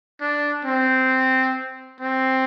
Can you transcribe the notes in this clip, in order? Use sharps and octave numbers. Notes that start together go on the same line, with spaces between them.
D4
C4
C4